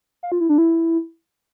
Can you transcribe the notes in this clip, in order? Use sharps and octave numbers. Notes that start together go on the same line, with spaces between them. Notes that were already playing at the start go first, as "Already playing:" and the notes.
F5
F4
E4
D4
E4